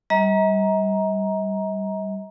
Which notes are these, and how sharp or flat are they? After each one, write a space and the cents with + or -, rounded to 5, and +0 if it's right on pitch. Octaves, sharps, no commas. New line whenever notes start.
G3 -10 D#5 +45 A#5 +10